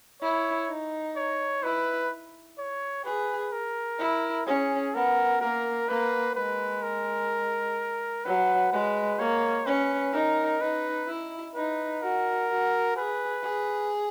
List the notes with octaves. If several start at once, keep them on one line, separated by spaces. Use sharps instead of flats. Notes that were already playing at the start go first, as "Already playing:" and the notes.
E4 C#5
D#4
C#5
E4 B4
C#5
G#4 B4
A#4
E4
C#4 G#4
B3 A#4
A#3 A#4
A#3 B4
G#3 B4
A#4
F#3 B4
G#3 B4
A#3 C#5
C#4 B4
D#4 A#4
D#4 B4
E4
D#4 B4
F#4 A#4
F#4
G#4 B4
G#4